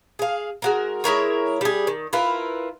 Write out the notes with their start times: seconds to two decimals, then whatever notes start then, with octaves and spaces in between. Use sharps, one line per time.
0.19 G#4 F5
0.62 G#3 F#4 A#4
1.04 G#3 E4 A#4 C#5
1.61 G3 G#4
1.87 D#3
2.13 E4 F4 A#4 B4